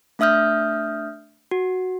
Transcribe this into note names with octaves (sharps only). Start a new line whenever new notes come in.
A3 D4 E5 D#6 F6 G6
F#4